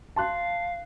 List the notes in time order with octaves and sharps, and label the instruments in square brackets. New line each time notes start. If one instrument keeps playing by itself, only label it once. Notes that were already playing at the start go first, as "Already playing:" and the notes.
[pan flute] F5 [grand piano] A5 C6 F#6